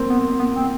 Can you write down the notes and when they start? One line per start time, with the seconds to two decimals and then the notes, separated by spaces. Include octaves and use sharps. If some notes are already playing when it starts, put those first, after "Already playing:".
Already playing: A#3 C4
0.09 B3
0.39 B3
0.54 C4